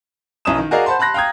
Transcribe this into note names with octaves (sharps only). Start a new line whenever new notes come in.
B1 C#4 D#4 E4 D#6 E7
D#3
F#4 G#4 A#4 D5 D#5 F5
C5 F#5 A5 B5 C6
A5 B5 C6 F#6 A#6
F5 G5 A#5 D#6 G#6